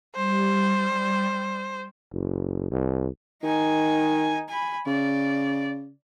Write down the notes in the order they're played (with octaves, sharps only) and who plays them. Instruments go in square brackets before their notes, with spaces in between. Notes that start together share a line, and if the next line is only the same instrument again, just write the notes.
[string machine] G3 [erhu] C5
[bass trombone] F#1
C2
[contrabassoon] D#3 [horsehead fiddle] D#4 G#5
[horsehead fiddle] G#5 B5
[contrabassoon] C#3 [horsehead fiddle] D5